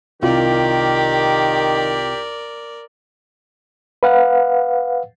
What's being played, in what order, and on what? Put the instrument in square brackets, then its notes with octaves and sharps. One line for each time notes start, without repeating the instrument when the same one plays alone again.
[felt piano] C2 F4 [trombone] D#3 [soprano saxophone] G4 [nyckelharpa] A#4 D5
[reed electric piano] B4 F5 F#5